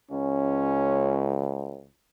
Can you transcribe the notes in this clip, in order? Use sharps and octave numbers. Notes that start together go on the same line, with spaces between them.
C#2 C#4